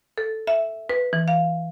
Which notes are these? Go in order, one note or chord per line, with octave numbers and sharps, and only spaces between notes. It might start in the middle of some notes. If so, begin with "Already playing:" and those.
A4
E5
B4
E3
F5